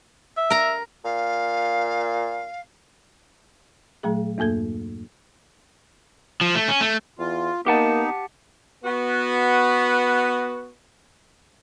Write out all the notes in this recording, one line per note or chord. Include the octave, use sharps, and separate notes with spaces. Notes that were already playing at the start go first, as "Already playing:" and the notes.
E5
A#4 A#5
A#2 F5
A#2 F#3 A3 G#4
E2 G2 A#3 A4 G#6
F3
A3
C#4
A3
E2 F4
A#3 B3 D#4 G4 F#5 A5
B3 F#4